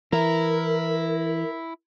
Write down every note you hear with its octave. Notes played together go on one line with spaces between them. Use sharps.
E3 E4 A#4